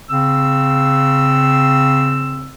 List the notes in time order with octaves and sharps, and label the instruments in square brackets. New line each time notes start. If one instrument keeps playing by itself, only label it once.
[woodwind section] C#3 C4 E6